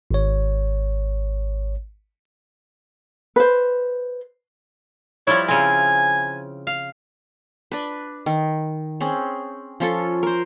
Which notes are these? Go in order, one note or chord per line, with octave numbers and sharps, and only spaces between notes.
G#1 C#5
B4 C5
F3 G3 E4 C#5
C#3 C4 G#5
F5
D4 B4
D#3
C4 C#4 G#4
F3 C#4 F4 A4
A#4 C5